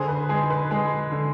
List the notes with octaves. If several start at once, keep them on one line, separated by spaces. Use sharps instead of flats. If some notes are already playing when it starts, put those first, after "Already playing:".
Already playing: D3 G#4 C5
B4
G#3 G#4
B4
G#3 G#4
D3